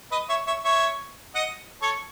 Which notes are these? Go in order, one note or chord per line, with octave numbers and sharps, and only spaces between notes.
B4 D#5
C#5 E5
C#5 E5
C#5 E5
D#5 F#5
A4 C#5